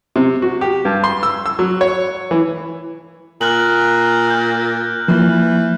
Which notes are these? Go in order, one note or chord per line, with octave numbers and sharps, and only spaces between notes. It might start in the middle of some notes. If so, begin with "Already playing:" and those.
C3
F#4
G4
G2
C6
E6
E6
F#3
C#5
E3
A#2 F6 F#6 F#7
F6 G6
E3 F3 A#3